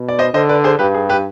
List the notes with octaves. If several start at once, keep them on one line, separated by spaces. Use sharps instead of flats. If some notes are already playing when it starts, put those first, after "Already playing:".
Already playing: B2
D5
C5 D#5
D3 C5 D#5
B4 D5
G#4 C5
G2 G4 B4
G#4
G4 B4